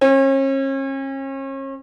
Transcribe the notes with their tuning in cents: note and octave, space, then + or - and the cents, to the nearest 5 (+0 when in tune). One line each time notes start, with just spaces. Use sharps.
C#4 -40